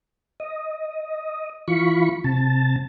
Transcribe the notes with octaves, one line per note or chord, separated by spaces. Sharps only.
D#5
E3 F4 B5 C#6
C3 A5